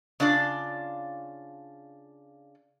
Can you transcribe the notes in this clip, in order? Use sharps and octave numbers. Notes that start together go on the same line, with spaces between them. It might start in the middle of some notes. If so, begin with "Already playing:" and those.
C#3 D4 F4 D5